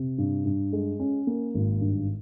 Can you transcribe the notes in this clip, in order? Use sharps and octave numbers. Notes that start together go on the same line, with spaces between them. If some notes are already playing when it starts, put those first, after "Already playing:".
Already playing: C3
G2
G2
G#3
C#4
A#3
G#1
G2